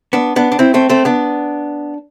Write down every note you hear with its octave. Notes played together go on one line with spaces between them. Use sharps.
B3 D4
B3 D4
D4
C4 E4
A3 C4
A3 C4
B3 D4